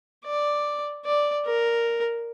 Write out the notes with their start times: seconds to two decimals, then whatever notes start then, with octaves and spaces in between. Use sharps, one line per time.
0.25 D5
1.05 D5
1.46 A#4